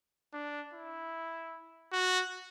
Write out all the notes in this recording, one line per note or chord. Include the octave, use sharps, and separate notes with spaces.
D4
E4
F#4